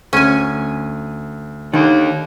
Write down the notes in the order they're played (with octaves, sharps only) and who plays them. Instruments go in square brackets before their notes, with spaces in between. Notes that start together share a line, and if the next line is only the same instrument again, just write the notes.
[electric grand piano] D2 [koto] C#4 G#5
[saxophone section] D#2 [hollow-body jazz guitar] D3 D#3